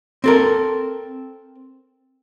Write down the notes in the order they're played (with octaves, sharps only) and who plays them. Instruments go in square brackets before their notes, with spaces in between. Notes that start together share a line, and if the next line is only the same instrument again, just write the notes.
[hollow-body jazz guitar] C4 A4 A#4